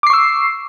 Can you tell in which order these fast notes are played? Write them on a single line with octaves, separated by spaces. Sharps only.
D6 C7 C#6 E6